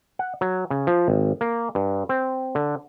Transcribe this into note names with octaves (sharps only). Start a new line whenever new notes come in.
F#5
F#3
C#3
F3
G#1
A#3
G2
C4
D3